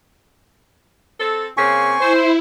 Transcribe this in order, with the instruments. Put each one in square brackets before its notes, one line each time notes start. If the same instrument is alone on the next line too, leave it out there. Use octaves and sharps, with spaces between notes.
[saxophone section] C4 A4
[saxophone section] C#3 A#3 C4 [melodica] G#5 C#6
[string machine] E4 [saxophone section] C5